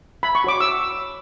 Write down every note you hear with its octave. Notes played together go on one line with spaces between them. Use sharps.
B5
C#6
F#4 C#5 D6
E6